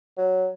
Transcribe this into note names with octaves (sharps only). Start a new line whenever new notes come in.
F#3